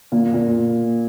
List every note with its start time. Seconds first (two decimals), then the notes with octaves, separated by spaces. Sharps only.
0.12 A#2
0.34 A#2